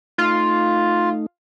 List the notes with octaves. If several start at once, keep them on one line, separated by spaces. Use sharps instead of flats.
A3 D#4 F4